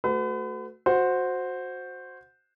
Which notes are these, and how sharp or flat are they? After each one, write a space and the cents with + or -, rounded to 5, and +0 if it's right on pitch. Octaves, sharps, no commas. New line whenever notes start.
A3 +0 F#4 +0 B4 +40
F#4 -15 C5 +0